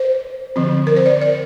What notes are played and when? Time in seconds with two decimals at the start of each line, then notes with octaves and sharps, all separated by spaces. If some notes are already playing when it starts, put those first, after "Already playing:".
Already playing: C5
0.56 D3 F3 C4
0.87 A#4
0.96 C5
1.06 D5
1.22 D5